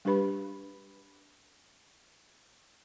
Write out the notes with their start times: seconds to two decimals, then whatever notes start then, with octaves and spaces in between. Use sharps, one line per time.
0.05 G3 D4 G4 B4 B5